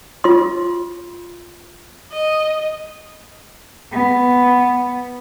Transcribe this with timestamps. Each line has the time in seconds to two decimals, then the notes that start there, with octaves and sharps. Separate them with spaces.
0.24 F4 C6
2.13 D#5
3.91 B3